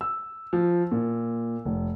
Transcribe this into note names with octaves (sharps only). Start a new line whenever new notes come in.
E6
F3
A#2
F1